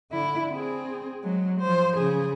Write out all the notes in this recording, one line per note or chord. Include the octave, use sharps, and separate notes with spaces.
D3 E4
C4 G#4
F#3 G#3
F3 C5
C#3 G#4